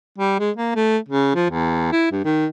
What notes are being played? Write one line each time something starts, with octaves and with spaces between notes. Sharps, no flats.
G3
G#3
A#3
A3
C#3
F3
E2
E4
G2
D#3